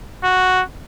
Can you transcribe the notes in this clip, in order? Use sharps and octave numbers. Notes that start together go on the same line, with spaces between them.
F#4